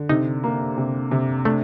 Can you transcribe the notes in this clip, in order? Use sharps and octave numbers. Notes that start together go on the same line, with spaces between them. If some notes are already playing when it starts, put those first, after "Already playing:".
Already playing: D3
C3 D#4
A#3
C3
C3
A3 D4